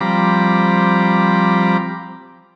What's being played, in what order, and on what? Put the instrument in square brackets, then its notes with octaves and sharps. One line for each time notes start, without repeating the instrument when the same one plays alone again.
[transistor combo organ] F3 G3 C4 A#5 B5 D6